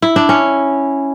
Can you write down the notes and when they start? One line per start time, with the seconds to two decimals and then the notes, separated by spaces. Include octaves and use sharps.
0.02 E4
0.16 D4
0.29 C#4